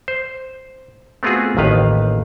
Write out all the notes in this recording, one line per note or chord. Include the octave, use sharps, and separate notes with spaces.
C5
A3 B3 C4 F4 F#4 G#4
A1 D#2 D#3 B4 F5